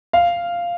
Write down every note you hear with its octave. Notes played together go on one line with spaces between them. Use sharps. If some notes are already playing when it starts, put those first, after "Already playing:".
F5